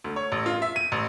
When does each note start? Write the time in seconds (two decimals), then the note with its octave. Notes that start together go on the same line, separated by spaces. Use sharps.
0.04 D2
0.16 C#5
0.32 A1
0.46 F4
0.62 E5
0.76 D#7
0.92 A1